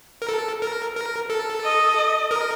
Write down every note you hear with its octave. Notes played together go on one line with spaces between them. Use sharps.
A#4
A4
A#4
A#4
A4
D#5
A#4